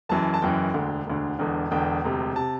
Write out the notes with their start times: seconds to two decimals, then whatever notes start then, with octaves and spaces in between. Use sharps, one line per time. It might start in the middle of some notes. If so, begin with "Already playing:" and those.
0.09 F#1 F#2 E3 A5
0.34 A5
0.42 F#1 F#2 E3 G5
0.74 E1 D2 D3
1.07 E1 D2 D3
1.39 E1 E2 D3
1.71 E1 E2 D3 G5
2.04 E1 D2 C3
2.36 C3 A5